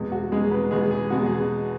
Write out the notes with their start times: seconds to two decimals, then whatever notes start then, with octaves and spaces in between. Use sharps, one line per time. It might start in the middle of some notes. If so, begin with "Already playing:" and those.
Already playing: E2 B2 G#3
0.12 F#4
0.32 E2 B2 G#3 G#4
0.51 B4
0.71 E2 B2 G#3 B3 G#4
0.91 G#4
1.10 E2 B2 G#3 B3 F#4
1.26 G#4